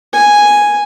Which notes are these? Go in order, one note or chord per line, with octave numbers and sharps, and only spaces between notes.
G#5